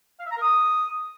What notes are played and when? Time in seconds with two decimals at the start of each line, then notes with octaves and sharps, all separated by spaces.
0.20 F5
0.25 E5
0.31 A#5
0.36 A#4
0.42 D#6